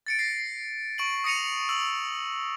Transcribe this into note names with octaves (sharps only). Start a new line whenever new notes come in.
A6 C#7 D7
A#6 C7
C#6 D7 F#7
D#6 A#6 C#7 D#7 F7
E6 F#7